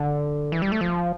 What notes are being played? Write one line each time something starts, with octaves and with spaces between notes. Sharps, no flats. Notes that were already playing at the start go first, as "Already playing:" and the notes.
Already playing: D3
E3
G3
A3
F3